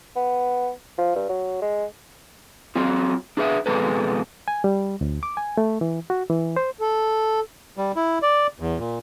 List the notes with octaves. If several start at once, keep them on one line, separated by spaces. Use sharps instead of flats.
B3
F3
G2
F#3
G#3
F#3 C4 F4
D4 G#4 B4 E5
F2 B2 D#3 G#3 A4 B4
G#5
G3
D2
D6
G#5
A3
E3
F#4
E3
C5
A4
G3
E4
D5
E2
A#2